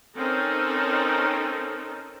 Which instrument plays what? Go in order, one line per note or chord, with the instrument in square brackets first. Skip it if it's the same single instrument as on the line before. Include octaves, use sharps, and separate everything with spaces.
[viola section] C4 C#4 D#4 A4 A#4